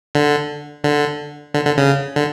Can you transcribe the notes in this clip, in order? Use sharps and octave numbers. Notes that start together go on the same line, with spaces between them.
D3
D3
D3
D3
C#3
D3